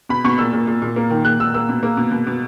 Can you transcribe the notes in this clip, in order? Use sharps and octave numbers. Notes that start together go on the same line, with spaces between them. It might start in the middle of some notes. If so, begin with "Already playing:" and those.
B2 B5
B2 C#6
A#2 E6
A#2
A#2
A#2
A#3
D#3
A#2 F#6
A#2 E6
A#3 E6
B2
A#3
B2
B2
B2